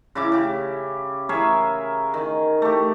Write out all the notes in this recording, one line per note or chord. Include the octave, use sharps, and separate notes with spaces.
C#3 E4 D6
C#3 G4
G#4 A#4 C#5 E5
D#3
A3 G4